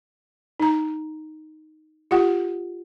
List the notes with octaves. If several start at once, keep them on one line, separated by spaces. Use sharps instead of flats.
D#4 A#5
F4 G4 F#5